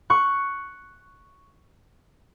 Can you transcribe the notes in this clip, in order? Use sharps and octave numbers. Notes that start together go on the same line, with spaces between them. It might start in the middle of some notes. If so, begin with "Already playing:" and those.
C#6 F#6